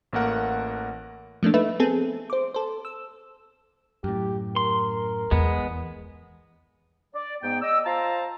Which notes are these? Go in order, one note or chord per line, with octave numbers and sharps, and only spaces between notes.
A1 A3 A#3 A#4 F#5
F3 A3 A#3 D4
A3 D#4 B4 E5
B3 C4 G#4 A4
C5 D6
A4 C5
E6
F#2 A2 G4
A#4 C6
E2 G#3 B3
D5
G#2 B3 G5
D5 D#5 E6
F4 C5 A5 A#5